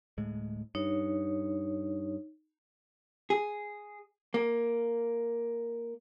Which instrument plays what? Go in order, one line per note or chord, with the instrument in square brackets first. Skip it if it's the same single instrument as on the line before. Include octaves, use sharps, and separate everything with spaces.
[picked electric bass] D1 A2 G#3
[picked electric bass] G2 [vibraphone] D#4 C#5
[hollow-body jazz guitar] G#4
A#3